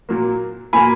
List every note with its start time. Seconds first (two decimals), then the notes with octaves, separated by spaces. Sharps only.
0.09 A#2 F#3 A#3
0.73 A#2 F#3 A#3 G#5 B5